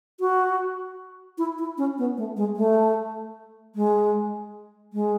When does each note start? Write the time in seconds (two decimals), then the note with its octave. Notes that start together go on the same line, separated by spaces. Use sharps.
0.20 F#4
1.38 E4
1.58 E4
1.78 C#4
1.98 B3
2.17 A3
2.37 G#3
2.57 A3
3.75 G#3
4.93 G#3